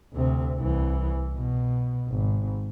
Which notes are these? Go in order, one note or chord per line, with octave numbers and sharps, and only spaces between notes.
D2 C3
C2 E3
B2
G#1